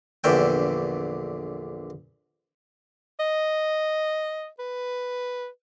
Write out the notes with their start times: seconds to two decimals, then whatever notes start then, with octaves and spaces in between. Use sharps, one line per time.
0.24 A#1 E2 D3 E5 G5
3.20 D#5
4.59 B4